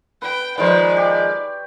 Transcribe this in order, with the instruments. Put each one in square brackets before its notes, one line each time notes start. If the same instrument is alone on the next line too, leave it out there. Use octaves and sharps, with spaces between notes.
[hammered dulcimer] B4 [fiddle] G5
[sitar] D#3 F3 G#3 [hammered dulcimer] B4 C5 [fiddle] D5
[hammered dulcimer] G4 C#6